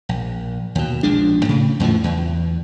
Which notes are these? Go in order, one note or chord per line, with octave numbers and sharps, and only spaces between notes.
A#1
D#2 B2
A#1 F3 G#3 D4
A2 C#3
E2 A2 D3 F3
E2